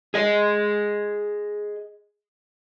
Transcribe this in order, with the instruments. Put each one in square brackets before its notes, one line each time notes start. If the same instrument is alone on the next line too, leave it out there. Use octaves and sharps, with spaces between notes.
[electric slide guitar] G#4 D#5